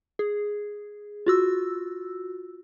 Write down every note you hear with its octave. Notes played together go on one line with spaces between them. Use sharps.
G#4
F4 F#4 E6